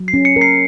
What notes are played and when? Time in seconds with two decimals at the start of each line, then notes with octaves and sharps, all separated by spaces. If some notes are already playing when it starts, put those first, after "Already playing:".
Already playing: F#3
0.08 C7
0.14 C#4
0.25 C#7
0.36 A#4
0.41 C7